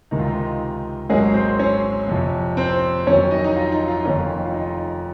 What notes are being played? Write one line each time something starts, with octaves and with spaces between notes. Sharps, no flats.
C#2 C3 D#3 G#3 D#4
F4
D#4
G#1 G#2 F#3 G#3 A#3 C#4 G#4
C4 C5
C#4 C#5
F2 C3 F3
C4 C5
F2 D#3 F#3 C#4 C#5
D#4 D#5
D#4
F4
D#4
F4
F1 F2 D#3 A#3 C#4 F4
F4
D#4